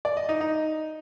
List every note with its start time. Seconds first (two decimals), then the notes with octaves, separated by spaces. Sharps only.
0.05 D5
0.17 D#5
0.29 D#4
0.41 D#4